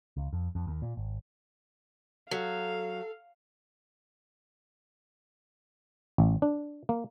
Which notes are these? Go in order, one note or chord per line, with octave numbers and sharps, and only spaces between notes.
C#2
F2
F2
D#2
A#2
G#1
F#3 A4 F5
A1
D4
A#3